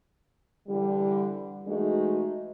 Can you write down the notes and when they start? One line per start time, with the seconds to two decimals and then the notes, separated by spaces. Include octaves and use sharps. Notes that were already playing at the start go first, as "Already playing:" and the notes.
0.67 D3 E3 G3
1.67 E3 G#3 A3 D#4 F#4